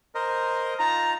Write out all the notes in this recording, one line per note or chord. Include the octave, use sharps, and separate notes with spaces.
A#4 C5 D#5
D#4 F4 A5 A#5